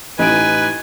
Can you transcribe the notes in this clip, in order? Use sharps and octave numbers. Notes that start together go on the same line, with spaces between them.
A1 D#4 E4 B4 G#5 D7